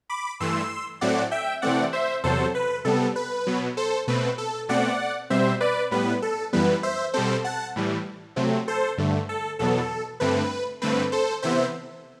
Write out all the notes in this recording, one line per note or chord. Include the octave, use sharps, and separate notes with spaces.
B5 D6
G2 E3 A3 C6 E6
A2 F#3 A3 C4 D5 F#5
E5 G5
C3 E3 A3 C4 D5 F#5
C5 E5
E2 C3 F#3 A4 C5
B4
C3 G3 B3 A4
B4
B2 F#3 B3
A4 C5
B2 A3 C4 B4
A4
B2 A3 C4 D5 F#5
B2 G3 C4 C5 E5
B4 D5
A2 G3 B3 B4
A4
F#2 E3 G3 B3 B4
C5 E5
B2 G3 C4 A4 C5
F#5 A5
A2 E3 G3
C3 F#3 A3 C4
A4 C5
G2 D3 A3
A4
E2 B2 F#3 B3 A4
G2 D3 A3 C4 B4
G2 D3 A3 C4 B4
A4 C5
C3 E3 B3 C5 E5